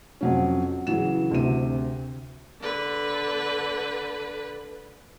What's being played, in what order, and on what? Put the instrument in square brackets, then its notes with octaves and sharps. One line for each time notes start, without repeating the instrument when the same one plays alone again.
[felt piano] F2 F#3 C#4
C#3 E3 F#3 E7
D2 C3 D#7
[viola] D3 B4